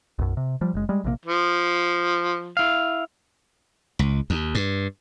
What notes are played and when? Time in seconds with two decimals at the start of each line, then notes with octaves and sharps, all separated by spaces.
0.19 B1 F#2
0.37 C3
0.61 F3 G3
0.74 F#1 G#3
0.89 G3 G#3
1.04 A#1 C3 D#3 A#3
1.26 F3
2.57 E4 F5
3.99 C#2
4.30 D#2
4.55 G2